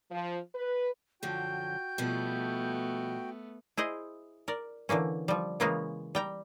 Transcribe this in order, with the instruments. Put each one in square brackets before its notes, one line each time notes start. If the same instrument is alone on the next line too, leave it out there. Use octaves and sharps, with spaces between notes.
[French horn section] F3
B4
[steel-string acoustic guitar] F#2 D3 F3 [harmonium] F#4 G5 [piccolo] G6
[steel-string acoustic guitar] B2 F3 G3 [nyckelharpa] A3 B3
[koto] E4 G#4 C5 D#5
A#4 D5
D3 E3 A#3 C#4
F3 G3
C#3 E3 G#3 A#3 B3 C#4
G3 G5 A#5